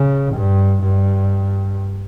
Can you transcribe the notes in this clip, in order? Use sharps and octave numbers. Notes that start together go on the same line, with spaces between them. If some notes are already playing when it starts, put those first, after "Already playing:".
Already playing: C#3
G2
G2